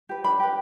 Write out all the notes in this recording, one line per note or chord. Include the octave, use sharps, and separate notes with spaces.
G4 B4
D4 B5
G4 B4